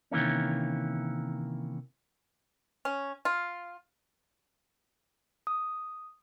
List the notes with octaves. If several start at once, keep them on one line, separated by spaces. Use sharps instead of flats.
C3 D#3 E3 A#3 C#4
C#4
F4
D#6